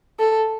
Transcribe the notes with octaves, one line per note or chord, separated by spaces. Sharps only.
A4